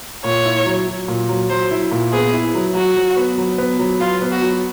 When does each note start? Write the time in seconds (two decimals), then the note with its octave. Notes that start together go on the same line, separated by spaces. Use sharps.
0.24 A#2 C#5
0.45 E4
0.66 F#3
0.88 F#3
1.08 A#2
1.29 F#3
1.49 F#3 C5
1.71 E4
1.92 A#2
2.12 B3 G#4
2.33 E4
2.55 F#3
2.75 F#3 F#4
2.96 F#3
3.17 B3
3.38 F#3
3.58 B3
3.79 F#3
4.00 F#3 F4
4.22 B3
4.32 F#4
4.42 F#3